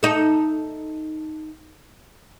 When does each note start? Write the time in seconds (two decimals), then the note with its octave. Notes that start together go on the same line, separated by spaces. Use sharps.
0.03 D#4 A4